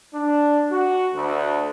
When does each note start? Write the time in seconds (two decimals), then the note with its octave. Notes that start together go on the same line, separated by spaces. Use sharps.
0.13 D4
0.71 F#4
1.15 D2